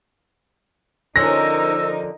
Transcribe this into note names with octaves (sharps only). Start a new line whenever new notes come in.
D3 F3 C#4 D#4 A#4 E6 A#6